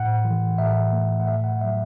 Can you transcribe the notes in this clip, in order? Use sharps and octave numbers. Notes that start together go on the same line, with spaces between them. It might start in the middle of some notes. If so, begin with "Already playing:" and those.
Already playing: A2 F#5
E3
A2 E5
A3
F#5
A2 E5
F#5
F#3 E5